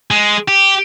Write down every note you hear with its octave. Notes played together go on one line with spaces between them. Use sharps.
G#3
G4